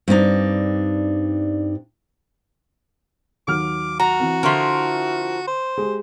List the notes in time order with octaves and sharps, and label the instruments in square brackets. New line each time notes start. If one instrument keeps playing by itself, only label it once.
[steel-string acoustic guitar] G2 C4 D4 D#4
[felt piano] D#2 F#3 F6 [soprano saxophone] D6
[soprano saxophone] F#4 [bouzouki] A#5
[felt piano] E3 C4
[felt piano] D3 C6 C#6 [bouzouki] F3 E4 A#4
[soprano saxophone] C5
[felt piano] G#3 G4